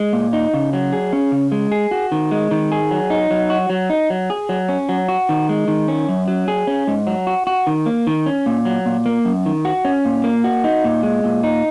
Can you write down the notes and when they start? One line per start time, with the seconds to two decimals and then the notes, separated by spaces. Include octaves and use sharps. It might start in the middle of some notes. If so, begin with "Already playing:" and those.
Already playing: G#3
0.13 A#2
0.33 D#4
0.53 C#3
0.73 F#3
0.93 G#4
1.13 C#4
1.32 C#3
1.52 G#3
1.71 G#4
1.91 F#4
2.12 D#3
2.31 G#3
2.51 D#3
2.72 G#4
2.91 F#3
3.10 D#4
3.30 F#3
3.50 F#4
3.70 F#3
3.90 D#4
4.10 F#3
4.30 G#4
4.49 F#3
4.69 C#4
4.89 F#3
5.09 F#4
5.29 D#3
5.49 G#3
5.68 D#3
5.88 C#4
6.08 F#2
6.28 F#3
6.48 G#4
6.67 C#4
6.87 G#2
7.07 F#3
7.27 F#4
7.47 F#4
7.67 D#3
7.86 A#3
8.07 D#3
8.26 C#4
8.46 A#2
8.65 F#3
8.86 A#2
9.06 A#3
9.25 F#2
9.46 D#3
9.65 F#4
9.85 C#4
10.05 A#2
10.24 A#3
10.44 F#4
10.64 D#4
10.84 A#2
11.03 G#3
11.24 A#2
11.43 D#4